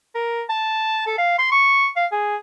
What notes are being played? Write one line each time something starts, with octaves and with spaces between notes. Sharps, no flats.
A#4
A5
A4
F5
C6
C#6
F5
G#4